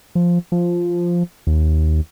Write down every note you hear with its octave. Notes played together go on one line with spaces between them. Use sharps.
F3
F3
D#2